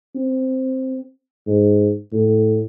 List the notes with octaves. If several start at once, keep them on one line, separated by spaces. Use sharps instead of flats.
C4
G#2
A2